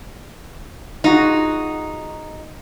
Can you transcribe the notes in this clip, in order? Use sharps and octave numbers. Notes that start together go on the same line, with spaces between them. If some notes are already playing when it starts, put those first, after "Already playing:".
D#4 F4 F#4 G#4